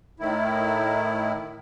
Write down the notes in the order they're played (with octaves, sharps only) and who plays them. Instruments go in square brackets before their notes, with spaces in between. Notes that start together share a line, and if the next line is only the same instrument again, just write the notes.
[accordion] A2 D#3 E4